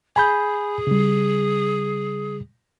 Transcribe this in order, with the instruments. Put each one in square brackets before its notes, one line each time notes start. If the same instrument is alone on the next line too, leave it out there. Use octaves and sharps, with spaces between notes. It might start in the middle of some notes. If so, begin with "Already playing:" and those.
[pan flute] G#4 [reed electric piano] G#5 B5 G6
[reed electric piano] C#3 G3